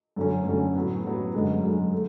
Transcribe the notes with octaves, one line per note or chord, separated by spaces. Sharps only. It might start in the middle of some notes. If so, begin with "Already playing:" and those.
F#2 D3 A3 C#4
F#2 D3 A3 C#4
A2 F#3 B3
A2 F#3 B3
F#2 D3 G#3
F#2 D3 G#3
A3